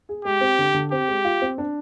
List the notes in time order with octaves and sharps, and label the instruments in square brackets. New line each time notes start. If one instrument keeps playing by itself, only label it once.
[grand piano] G#4
[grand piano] G#3 [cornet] G4
[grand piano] C4
D3
D3
[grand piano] C4 [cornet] G4
[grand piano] G#3
F4
C4
D4